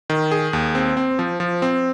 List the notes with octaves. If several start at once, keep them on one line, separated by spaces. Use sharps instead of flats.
D#3
G#4
D#2
C4
C4
F3
F3
C4